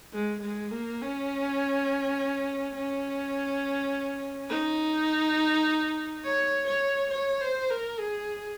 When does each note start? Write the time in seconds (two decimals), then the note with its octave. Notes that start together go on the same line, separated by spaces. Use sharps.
0.13 G#3
0.42 G#3
0.72 A#3
1.01 C#4
2.76 C#4
4.49 D#4
6.25 C#5
6.68 C#5
7.11 C#5
7.41 C5
7.70 A#4
7.99 G#4